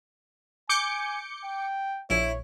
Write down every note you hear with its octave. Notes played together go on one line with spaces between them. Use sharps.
G#5 D6 G6 C#7
G5
A#1 E4 C#5